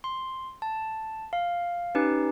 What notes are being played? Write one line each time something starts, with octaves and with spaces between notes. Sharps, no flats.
C6
A5
F5
C#4 D#4 G4 B4